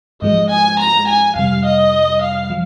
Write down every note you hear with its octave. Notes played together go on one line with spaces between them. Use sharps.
G#2 F3 G#3 D#5
G#5
A#5
G#5
F2 C3 G3 F5
D#5
F5
F3